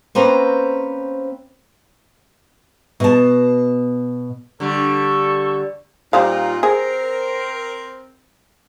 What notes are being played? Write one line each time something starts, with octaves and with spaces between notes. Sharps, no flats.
A#3 C4 C#4 B4 C5 A#5
B2 A5
D3 G3 A4 C#6
A#2 G3 C4 D#4 F4 F5
C4 G#4 A#4